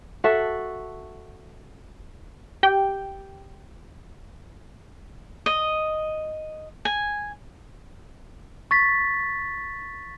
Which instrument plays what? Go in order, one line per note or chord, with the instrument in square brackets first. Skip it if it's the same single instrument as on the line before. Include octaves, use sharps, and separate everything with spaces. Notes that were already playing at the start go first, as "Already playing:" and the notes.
[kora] F#4 A4 E5
[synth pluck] G4 G5
[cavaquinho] D#5
G#5
[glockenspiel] C#6 A6 B6